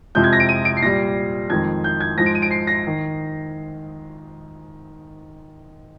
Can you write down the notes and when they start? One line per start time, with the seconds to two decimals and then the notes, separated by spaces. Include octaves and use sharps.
0.15 F2 C3 F3 G#3 G6
0.24 G#6
0.33 A#6
0.40 D7
0.49 D#7
0.65 D7
0.77 C7
0.82 A#2 G3 A#6
1.49 F2 D#3 G#3 G#6
1.84 G6
2.00 G#6
2.17 G#2 F3 G#3 A#6
2.26 D7
2.35 D#7
2.42 D7
2.51 C7
2.67 A#6
2.87 D#3